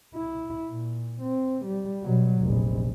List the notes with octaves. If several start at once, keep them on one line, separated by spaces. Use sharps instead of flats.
E4
A#2
C4
G3
B2 F#3
F1 A#1